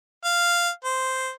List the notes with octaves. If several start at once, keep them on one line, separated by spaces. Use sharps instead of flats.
F5
C5